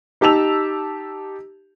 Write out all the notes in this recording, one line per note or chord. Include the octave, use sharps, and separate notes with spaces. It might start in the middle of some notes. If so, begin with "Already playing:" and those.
D#4 G4 A5 E6 F7